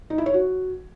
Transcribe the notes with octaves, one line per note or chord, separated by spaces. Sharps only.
D#4
E4
C#5
F#4